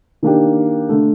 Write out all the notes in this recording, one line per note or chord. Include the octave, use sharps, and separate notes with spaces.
D#3 A#3 D4 G4
D3 A3